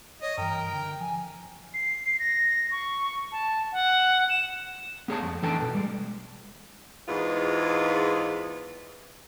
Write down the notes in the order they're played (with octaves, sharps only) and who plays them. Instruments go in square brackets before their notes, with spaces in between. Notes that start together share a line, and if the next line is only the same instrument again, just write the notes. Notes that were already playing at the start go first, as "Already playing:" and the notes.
[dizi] C#5 [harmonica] D#5
[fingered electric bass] G2 E3 [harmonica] A#4 [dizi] G5
[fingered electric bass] D3
[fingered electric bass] F3 [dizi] G#5
[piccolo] C7
A#6
C#6
A5
F#5
E7
[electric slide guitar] B3 G#4 C#5 A5
F2
E3 D4 A4 G5 A5
B2
G3 G#3
[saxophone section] E2 G#2 E3 G#3 B3 F4